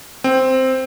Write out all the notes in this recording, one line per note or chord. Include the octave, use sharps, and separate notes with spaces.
C4